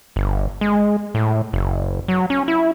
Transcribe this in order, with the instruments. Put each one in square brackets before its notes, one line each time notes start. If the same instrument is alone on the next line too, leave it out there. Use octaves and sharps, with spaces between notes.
[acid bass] G1
G#3
A2
F#1
F#3
C#4
E4